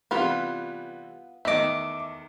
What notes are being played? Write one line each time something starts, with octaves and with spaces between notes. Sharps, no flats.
C3 E3 G3 B3 F4 B4
E2 D#3 A3 D#5 E5 D6